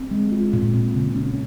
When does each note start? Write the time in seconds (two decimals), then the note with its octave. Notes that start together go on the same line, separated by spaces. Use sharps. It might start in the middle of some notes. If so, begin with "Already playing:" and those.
Already playing: C4
0.11 G#3
0.32 F4
0.53 A#2
0.74 C4
0.95 C#3
1.16 C#4